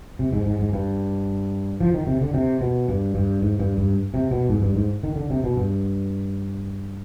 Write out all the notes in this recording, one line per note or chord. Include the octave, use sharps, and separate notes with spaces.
C3
G#2
G#2
G#2
G2
F3
D#3
C3
D3
C3
B2
G2
G2
G#2
G2
G2
C3
B2
G#2
G2
G#2
D#3
D3
C3
B2
G2